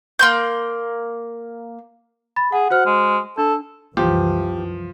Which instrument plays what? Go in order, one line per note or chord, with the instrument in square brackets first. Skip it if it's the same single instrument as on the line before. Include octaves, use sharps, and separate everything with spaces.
[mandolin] A#3 C6 G6
[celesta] B5 A6
[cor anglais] G#4 [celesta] F#5
[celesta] F#4 C5 F6 [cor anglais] F#5
[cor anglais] G#3
[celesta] D4 [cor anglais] A4
[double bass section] C2 F#2 E3 [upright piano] F3 [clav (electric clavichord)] G4